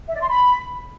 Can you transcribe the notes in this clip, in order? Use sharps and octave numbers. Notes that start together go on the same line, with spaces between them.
E5
D5
C6
B5